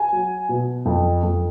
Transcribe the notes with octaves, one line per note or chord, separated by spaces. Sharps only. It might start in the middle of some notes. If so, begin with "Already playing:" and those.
Already playing: G#5
F#3
B2
F2
F2